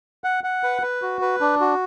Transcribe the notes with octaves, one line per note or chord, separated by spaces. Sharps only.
F#5
F#5
B4
B4
F#4
B4
D4
F#4